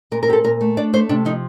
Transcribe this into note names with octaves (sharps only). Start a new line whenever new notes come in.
A#2 A#4
A#4
C4 G4 A4
A#2 A#4
A3
D4 D5
A3 C5
C3 D4
F3 D#4